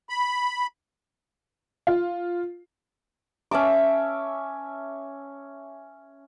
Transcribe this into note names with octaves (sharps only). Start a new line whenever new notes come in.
B5
F4
C#4 E5 A5 D6